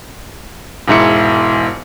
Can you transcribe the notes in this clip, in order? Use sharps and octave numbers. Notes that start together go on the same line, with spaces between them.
E1 G#2 E4 C#7